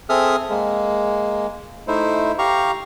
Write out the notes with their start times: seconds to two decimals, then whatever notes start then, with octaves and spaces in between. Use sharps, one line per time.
0.09 C4 G#4 A4 E5 D#6 F6
0.50 G#3 A#3
1.88 A3 D#4 E4 C5
2.39 G4 F5 A#5 C#6